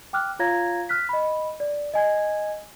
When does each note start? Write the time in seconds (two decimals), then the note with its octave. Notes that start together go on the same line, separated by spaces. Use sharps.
0.13 G5 D6 F6 F#6
0.39 F4 C#5 F5 A#5 G#6 A#6
0.89 F6 F#6 B6
1.09 D#5 B5
1.60 D5
1.94 D#5 G#5 G#6